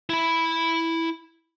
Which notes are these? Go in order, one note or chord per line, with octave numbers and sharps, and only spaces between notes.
E4 B5